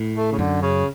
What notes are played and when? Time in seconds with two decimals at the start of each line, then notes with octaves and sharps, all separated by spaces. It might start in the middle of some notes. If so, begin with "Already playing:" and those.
Already playing: A2
0.16 A3
0.32 C#3
0.39 F#2 D3
0.62 C#3